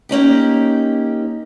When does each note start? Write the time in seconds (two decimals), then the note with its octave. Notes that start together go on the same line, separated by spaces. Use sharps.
0.09 A#3 C#4 D#4 G4